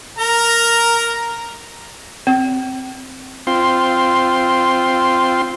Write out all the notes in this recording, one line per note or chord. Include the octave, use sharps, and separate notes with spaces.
A#4 A#5
C4
C4 F4 C6